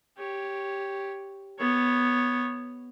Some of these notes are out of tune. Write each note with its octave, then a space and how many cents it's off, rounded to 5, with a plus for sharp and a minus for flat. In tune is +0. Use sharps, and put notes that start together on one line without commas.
G4 +0 C#5 +0
B3 +0 C#5 +0